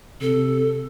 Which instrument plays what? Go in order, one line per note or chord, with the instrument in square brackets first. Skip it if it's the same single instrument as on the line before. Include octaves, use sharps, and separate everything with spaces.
[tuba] C3 [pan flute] A4